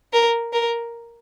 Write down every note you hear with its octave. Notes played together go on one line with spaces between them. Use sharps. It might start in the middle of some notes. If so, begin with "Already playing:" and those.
A#4
A#4